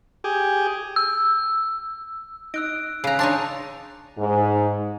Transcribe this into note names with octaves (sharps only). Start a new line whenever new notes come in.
G4 G#4
E6
D#4 E6 F#6 D7
C#3 G#5 A#5 F#6
D4 D#4 C#5 A5 C6
G#2